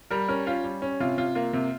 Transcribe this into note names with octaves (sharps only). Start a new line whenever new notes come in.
G3 A#4
C#4 A#4
C#4 F4
G3
C#4
C3 F4
C3 F4
A#3 F4
C3